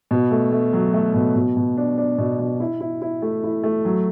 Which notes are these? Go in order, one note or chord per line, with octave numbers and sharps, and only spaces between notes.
B2
A3
A3
F#3
A3
B2
B2
B2
D4
D4
B2
B2
E4
E4
E4
A3
E4
A3
F#3